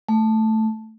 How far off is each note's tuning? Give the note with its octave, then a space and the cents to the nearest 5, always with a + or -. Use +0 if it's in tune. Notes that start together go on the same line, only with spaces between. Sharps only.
A3 +0